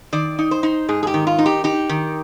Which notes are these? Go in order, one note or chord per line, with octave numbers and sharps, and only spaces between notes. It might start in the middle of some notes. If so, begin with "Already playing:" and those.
D#3 D5
D#4
C5
D#4
G#2 G#4
G#4
G4
D#3
F4
D#4
G4
D#4 G4
D#3